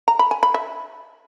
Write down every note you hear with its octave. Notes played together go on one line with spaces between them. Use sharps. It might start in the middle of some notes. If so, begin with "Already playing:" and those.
A#5
B5
G#5
B5
E5